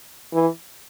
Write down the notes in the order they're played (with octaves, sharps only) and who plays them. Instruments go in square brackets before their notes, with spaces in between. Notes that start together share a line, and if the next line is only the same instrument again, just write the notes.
[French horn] E3